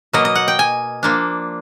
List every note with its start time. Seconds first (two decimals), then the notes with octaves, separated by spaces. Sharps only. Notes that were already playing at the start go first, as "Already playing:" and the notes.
0.13 B2 F#3 A#3 D#5
0.25 D#5
0.35 F#5
0.48 G5
0.59 G#5
1.03 F3 A#3 D4